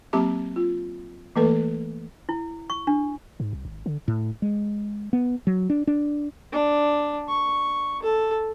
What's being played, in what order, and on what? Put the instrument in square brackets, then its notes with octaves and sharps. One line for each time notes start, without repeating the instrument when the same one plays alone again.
[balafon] F#3 A#3 C4 G4 A5 D6
F4
E3 A3 A#3 A4 B4
[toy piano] E4
C#6
D4
[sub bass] G#2
C2
G#1
D3
[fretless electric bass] A2
G#3
B3
F#3
D4
D4
[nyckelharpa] D4
C#6
A4